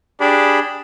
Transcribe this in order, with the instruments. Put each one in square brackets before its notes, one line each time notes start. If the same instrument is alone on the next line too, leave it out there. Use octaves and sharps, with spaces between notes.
[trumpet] D4 [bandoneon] G4 G#4 B5